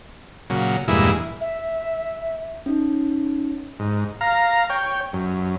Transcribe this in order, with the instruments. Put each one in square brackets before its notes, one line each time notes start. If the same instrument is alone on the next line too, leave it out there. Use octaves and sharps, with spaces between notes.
[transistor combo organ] A#2 C#3 F#3
E2 G2 A#2 G#3 E4
[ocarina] E5
[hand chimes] C#4 D#4
[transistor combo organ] G#2
F5 A#5
C#5 G5
F#2